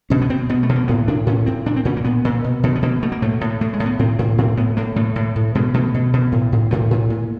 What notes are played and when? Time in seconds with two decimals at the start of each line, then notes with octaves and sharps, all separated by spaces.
0.10 B2 C#4
0.22 B3
0.30 B2 C4
0.49 B2 B3
0.63 A3
0.69 B2
0.76 A#3
0.88 A2 B3
1.08 A2 D4
1.27 A2 C#4
1.46 A2 C4
1.66 A#2 D4
1.76 C4
1.85 A#2 C#4
1.97 A#3
2.04 A#2 B3
2.25 A#2
2.44 B2
2.63 B2
2.76 B3
2.82 B2 A#3
3.02 B2 A3
3.12 A#3
3.22 A2 A3
3.41 A2
3.61 A2 A3
3.73 G#3
3.80 A2
3.86 B3
3.99 A2 C4
4.19 A2 A#3
4.38 A2 C4
4.57 A2 B3
4.77 A2 A#3
4.96 A2 A3
5.16 A2
5.36 A2
5.55 B2 G#3
5.74 B2 A3
5.94 B2
6.13 B2
6.32 A2
6.52 A2
6.71 A2 A3
6.91 A2
7.10 A#2